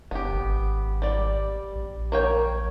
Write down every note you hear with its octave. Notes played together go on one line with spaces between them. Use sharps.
F#1 B3 G4
G#1
G3 D5
A#1
A#3 C#5 G5